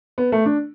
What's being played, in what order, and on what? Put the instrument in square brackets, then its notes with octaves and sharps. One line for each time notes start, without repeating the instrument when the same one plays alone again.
[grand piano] B3
A3
D4